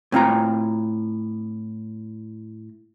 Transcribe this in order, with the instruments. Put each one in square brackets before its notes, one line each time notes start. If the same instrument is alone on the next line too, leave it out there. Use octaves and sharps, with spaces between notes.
[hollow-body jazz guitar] A2 C4 F4 A#5